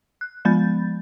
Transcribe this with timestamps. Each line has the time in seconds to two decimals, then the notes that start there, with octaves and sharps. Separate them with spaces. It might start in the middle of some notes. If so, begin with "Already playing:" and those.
0.21 F#6
0.45 F3 G#3 B3 B5 G6 A6